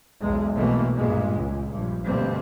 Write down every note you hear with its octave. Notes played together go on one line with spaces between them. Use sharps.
B1 E2 G#3
B1 B2 E3 A3 A#3
G2 A#2 G#3
C#2
A#1 G2
D2 G2 B2 G3 A#3 C4